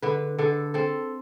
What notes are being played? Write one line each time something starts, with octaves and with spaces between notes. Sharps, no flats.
D3 B4
D3 A4
C4 A4